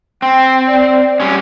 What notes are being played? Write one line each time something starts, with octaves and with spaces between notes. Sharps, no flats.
C4 G5
D5
G3 C#4